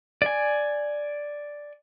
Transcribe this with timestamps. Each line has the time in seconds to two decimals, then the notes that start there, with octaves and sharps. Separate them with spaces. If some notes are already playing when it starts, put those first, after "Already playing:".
0.22 D5 G#5